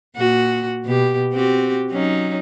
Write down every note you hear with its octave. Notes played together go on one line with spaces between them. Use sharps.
A#2 F#4
B2 G4
C4 F#4 G4
F#3 C#4 D#4